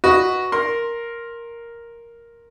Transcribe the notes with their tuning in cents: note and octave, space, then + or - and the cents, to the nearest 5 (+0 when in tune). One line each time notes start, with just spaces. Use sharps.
F#4 +0 B4 +0 D#5 +0
A#4 +0 C6 +15